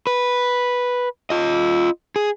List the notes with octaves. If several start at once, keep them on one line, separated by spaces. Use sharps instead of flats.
B4
F4 D#5
G#4